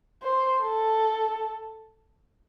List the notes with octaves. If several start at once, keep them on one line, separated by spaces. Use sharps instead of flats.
C5
A4